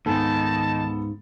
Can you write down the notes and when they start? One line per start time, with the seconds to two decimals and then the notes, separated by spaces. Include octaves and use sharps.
0.06 C#2 G#2 D#3 B3 A4 A5